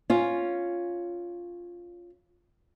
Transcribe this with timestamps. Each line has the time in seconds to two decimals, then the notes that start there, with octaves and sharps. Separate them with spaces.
0.10 C#4 F4